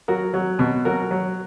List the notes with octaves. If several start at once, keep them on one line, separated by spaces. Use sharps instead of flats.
F#3 F#4 A#4
F#3
B2
F#3 F#4 A#4
F#3